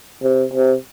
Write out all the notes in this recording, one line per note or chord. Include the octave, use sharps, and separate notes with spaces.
C3
C3